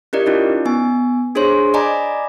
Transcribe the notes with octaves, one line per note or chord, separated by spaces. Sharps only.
C#4 E4 G4 A#4 D5 D#5
C#4 D#4 F4
B3 G#5
D4 G#4 C5 C#5 C6
D5 D#5 G#5 A#5 B5 D6